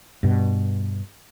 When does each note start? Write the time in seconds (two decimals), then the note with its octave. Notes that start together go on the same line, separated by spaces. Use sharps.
0.23 G2 B2